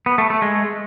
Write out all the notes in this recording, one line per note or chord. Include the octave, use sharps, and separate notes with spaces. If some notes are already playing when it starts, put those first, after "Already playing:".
B3
A3
A3
G#3